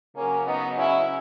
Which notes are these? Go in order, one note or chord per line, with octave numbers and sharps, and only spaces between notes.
C#3 F#3 A#3 C#4
B3 D#4
C#4 E4